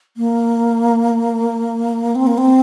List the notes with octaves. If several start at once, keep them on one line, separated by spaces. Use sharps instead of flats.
A#3
C4
A#3
C4